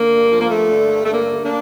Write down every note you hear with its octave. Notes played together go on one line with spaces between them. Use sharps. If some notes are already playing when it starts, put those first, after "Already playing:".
Already playing: D3 A#3
G2
F3
A#3
G2 A3
D3
G2
A3
D3 A#3
D2
A#3 D4